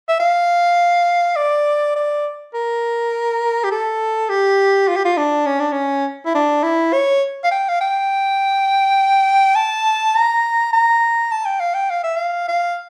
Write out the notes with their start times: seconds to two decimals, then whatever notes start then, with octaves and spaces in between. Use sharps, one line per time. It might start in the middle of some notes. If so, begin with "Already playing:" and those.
0.09 E5
0.20 F5
1.36 D5
1.95 D5
2.54 A#4
3.64 G4
3.71 A4
4.29 G4
4.88 F4
4.96 G4
5.05 F4
5.17 D4
5.46 C#4
5.60 D4
5.72 C#4
6.26 E4
6.34 D4
6.63 E4
6.93 C#5
7.44 F5
7.51 G5
7.69 F5
7.81 G5
9.55 A5
10.15 A#5
10.73 A#5
11.32 A5
11.46 G5
11.60 F5
11.74 G5
11.90 F5
12.03 E5
12.16 F5
12.48 F5